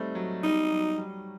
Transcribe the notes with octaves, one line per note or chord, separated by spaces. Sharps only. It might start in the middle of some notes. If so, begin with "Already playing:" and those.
Already playing: G3 A3 C4 D#4
F#3
G3 D#4
F#3
G3